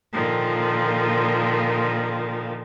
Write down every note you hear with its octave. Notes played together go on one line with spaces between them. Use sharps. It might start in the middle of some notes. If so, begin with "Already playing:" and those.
A#2 D3 D#3 F3